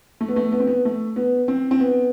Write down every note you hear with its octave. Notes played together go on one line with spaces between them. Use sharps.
A3
B3
A3
B3
C4
B3
A3
B3
C4
C4
B3